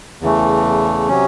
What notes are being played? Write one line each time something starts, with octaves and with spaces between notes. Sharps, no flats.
E2 C#3 E3 A3
C3 F#3 C#4